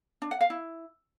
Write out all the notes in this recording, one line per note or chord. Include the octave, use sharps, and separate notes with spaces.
D4
F#5
F5
E4